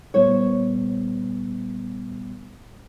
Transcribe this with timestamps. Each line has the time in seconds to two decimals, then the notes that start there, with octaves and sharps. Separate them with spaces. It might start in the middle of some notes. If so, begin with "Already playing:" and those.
0.14 A#2 G3 B3 C5 C#5